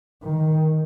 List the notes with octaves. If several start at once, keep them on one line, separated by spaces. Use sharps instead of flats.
D#3